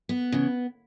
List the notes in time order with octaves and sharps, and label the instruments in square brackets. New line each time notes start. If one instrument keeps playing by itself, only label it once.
[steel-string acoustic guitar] B3
C#3 E3